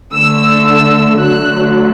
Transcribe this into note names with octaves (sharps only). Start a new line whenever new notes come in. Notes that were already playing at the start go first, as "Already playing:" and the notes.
D3 A3 E6
E6
D3 F#3 A3 F#6